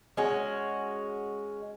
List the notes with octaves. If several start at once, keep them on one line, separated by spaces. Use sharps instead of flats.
G#3 C#4 F#4